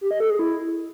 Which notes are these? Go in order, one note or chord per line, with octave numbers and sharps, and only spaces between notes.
G4
D#5
A4
G#4
E4